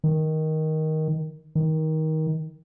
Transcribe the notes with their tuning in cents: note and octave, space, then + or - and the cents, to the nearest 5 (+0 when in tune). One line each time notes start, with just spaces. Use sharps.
D#3 +10
D#3 +20